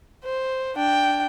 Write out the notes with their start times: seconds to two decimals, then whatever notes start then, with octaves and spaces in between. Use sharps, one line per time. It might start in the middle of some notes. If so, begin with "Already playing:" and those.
0.24 C5
0.76 D4 G5